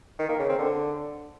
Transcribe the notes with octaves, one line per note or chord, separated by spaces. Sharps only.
D#3
A#3
C#3
C4
D3